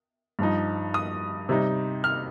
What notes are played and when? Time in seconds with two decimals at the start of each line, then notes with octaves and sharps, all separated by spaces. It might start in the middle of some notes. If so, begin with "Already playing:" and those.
0.39 G2 F3 D#4
0.94 D#6
1.49 C3 G3 D#4
2.04 F6